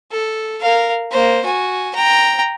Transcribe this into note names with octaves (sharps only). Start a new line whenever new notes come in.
A4
A#4 F5
A#3 C5
F#4 G#5
G5 A#5